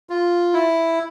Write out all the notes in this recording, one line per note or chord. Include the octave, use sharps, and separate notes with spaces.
F4
E4